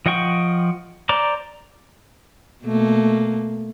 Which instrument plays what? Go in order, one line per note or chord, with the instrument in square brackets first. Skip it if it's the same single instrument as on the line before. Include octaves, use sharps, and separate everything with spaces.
[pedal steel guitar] F3 D#5 F#5 G5 C#6
C5 D5 A#5 D6
[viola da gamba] B2 A3 A#3